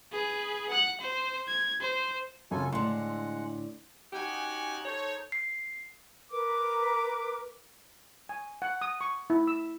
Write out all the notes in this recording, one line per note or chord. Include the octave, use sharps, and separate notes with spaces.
G#4 B4
F#5 F#6
C5
G#6
C5
F#2 C#3 F4 A4 G#5
A2 D3 G#3 F#5 C6
C#4 D#4 F#4 G4 F#5 G#5
D#4 A4 C5 C#5
C7
A#4 B4 D6
G#5
F#5
D#6
C#6
E4
E6